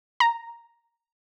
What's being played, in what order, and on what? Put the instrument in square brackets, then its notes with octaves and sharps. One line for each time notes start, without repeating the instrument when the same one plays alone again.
[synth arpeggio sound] A#5